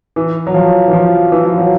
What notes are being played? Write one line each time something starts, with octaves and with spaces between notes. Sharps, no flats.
E3
F#3
F3
E3
F3
E3
F3
F#3